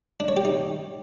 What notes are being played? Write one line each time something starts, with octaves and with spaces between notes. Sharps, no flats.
D4
C#5
G4
D#4